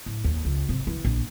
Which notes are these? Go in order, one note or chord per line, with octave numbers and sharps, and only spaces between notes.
A2
D#2
C#2
G#2 C3
E3
A#1